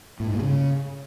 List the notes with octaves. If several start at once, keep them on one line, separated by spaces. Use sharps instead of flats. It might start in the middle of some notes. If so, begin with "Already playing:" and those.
A2
G#2
A#2
C#3